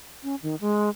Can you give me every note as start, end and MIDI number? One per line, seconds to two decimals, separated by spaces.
0.23 0.35 61
0.43 0.56 51
0.61 0.89 56